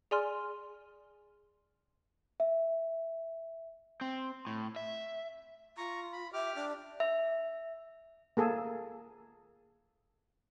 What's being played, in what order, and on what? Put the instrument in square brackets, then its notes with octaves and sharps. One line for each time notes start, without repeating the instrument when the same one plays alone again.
[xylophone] G#4 D5 G#5 C6 F6
[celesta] E5
[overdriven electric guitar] C4
A2
E5
[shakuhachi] F4 [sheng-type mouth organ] A#5 C#6
[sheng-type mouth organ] B5
[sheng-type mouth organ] G4 D6 F6 [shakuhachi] E5
[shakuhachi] D4
[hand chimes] E5
[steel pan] A#3 G#4 A4